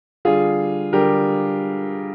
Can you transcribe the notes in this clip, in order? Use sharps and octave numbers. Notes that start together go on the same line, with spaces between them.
D3 G3 F4 G#4
D3 G3 G4 A#4